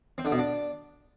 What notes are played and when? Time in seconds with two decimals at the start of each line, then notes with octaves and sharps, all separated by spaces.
0.18 C4
0.25 D3
0.32 B2
0.38 D4